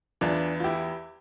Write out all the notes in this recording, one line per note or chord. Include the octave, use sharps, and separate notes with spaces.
E2 E3 D4 F4
F4
E4 G4